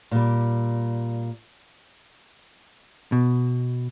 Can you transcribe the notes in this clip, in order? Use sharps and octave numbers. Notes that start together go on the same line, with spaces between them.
A#2 G3
B2